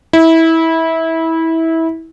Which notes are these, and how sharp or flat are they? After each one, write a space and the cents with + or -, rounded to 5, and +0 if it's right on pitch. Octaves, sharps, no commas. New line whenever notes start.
E4 -20